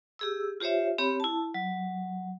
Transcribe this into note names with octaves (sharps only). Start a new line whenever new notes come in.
G4 G#4 E6
F4 G4 C5 C#5 E5
C4 G4 C#5 B5
E4 A5
F#3